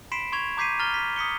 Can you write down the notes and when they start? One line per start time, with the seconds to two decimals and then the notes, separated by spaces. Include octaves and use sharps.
0.12 B5 C6 B6 C7 D7 E7
0.32 C6 C#6 G#6 F7
0.57 A#5 D6 G6 B6 C7 D#7
0.79 A#5 F6 A6 F7 G7
0.94 B6
1.16 D#6 B6 C#7 G7